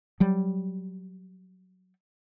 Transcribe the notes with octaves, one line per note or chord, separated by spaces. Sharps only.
F#3 G3